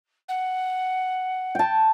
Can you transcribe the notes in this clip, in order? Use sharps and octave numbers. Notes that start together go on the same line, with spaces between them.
F#5
G5 A5